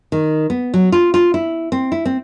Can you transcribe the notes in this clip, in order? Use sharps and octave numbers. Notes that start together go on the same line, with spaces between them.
D#3
B3
F#3
F4
F4
E4
C4
E4
C4